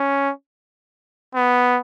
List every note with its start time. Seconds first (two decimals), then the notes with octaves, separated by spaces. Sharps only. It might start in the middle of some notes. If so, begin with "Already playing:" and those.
Already playing: C#4
1.35 B3